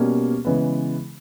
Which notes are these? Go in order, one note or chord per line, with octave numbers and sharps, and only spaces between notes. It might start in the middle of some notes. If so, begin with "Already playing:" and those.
Already playing: B2 G3 A#3 C#4
C#3 E3 G#3 B3